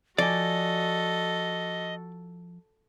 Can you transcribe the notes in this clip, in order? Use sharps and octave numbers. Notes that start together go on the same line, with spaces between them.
F3 F#4 A4 D5 D#5 G#5